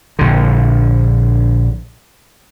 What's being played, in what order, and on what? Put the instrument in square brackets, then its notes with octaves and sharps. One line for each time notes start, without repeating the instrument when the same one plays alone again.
[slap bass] A#1 D3